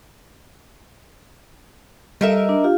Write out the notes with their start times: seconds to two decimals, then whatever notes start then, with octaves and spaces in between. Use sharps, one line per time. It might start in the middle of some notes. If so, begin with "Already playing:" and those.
2.21 G3 D#4 A4 A#4 E5
2.49 D4
2.64 F4 G4 F5